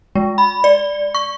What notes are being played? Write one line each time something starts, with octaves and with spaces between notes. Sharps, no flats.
G#3
B5
D5
C#6